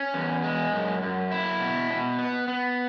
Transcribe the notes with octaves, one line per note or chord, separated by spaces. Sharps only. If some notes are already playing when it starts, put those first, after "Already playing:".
Already playing: C#4
E2
G#3
F#2
F#2
E4
B2
B2
B3
B3